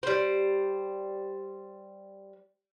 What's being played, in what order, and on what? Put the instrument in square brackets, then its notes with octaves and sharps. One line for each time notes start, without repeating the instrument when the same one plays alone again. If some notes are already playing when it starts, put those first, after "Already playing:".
[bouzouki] G3 C5